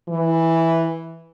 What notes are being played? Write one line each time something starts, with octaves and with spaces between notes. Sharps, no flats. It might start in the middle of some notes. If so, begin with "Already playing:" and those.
E3